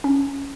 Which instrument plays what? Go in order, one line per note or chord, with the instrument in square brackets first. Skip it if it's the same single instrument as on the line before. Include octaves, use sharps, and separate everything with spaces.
[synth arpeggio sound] C#4